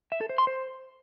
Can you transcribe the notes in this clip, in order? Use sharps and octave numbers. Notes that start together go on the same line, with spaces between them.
E5
A4
C5
C6
C5